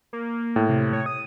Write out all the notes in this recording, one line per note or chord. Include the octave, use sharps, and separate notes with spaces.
A#3
A2
C3
C#5
D#6